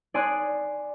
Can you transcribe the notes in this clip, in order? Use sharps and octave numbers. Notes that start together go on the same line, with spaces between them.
D5 G#5 C6 D#6 F#6